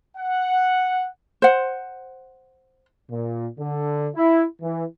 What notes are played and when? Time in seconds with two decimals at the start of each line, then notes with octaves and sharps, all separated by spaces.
0.17 F#5
1.42 C5 F#5
3.10 A#2
3.59 D3
4.16 E4
4.62 E3